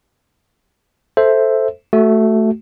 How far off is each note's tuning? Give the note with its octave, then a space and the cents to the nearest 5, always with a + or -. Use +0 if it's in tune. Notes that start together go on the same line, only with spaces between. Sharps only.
A4 +0 C5 +0 E5 +0
A3 +0 F#4 +15